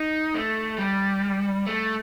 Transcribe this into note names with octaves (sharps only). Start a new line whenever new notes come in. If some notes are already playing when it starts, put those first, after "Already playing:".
Already playing: D#4
A3
G3
A3